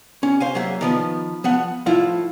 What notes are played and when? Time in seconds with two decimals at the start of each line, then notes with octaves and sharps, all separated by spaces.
0.23 C#4
0.40 C5 F5 G#5
0.55 F#3 A#3 E5
0.81 D#3 F3 B3
1.44 F3 B3 F#5
1.86 A2 F3 E4 F4 F5